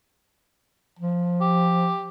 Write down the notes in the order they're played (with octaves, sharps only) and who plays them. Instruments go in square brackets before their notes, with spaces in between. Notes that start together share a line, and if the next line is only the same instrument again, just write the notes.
[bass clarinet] F3
[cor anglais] G4